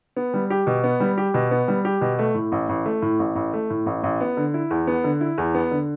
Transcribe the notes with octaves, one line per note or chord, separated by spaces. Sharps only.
B3
G3
G4
B2
B3
G3
G4
B2
B3
G3
G4
B2
A3
A2
A1
A1
A3
A2
A1
A1
A3
A2
A1
A1
B3
D3
E4
E2
B3
D3
E4
E2
B3
D3